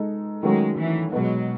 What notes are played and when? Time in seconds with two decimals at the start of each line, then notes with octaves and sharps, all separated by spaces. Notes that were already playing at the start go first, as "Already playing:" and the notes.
Already playing: G#3 D#4 A4
0.43 D#3 F#3 G#3 A3 C#4 F#4
0.77 E3
1.12 B2 F#3 G#3 B3